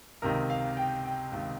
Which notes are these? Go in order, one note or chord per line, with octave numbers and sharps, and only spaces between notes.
C#2 C3 D#3 A#4
F5
G5
G5
C#2 C3 D#3